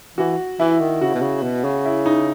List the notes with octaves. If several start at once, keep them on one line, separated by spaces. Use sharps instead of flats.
E3 F#4
E3 E4
D#3
C#3 F#4
B2
C#3
B2
C#3
E4
D#4